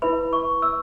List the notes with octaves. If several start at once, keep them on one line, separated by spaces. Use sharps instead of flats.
E4 B4 B5
C#6
E6